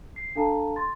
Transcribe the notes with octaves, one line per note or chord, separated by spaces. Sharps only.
C7
D4 A4 F5 A5 A#5
C6 A6